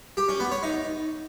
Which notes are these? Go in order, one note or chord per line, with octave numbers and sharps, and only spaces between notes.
G4
C#4
B3
C#5
D#4